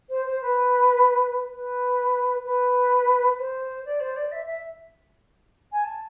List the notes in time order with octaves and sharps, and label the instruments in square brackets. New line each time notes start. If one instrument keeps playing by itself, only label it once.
[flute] C5
C5
B4
B4
B4
C5
D5
C5
D5
E5
E5
G#5
A5